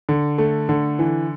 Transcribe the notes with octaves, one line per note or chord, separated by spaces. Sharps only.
D3
A3
D3
E3